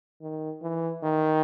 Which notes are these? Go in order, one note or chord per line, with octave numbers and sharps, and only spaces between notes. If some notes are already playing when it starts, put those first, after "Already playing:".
D#3
E3
D#3